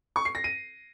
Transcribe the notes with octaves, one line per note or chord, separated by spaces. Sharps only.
C#6
C7
A#6
D#7